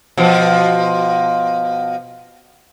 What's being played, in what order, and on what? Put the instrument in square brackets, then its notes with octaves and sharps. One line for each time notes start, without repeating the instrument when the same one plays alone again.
[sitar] B2 F3